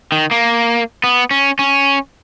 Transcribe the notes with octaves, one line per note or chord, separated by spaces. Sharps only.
D#3
A#3
B3
C#4
C#4